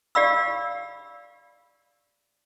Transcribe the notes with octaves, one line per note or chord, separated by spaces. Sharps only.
G4 D5 F5 B5 E6